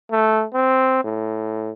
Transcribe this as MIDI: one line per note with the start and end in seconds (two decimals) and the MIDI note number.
0.11 0.44 57
0.54 0.99 60
1.04 1.71 45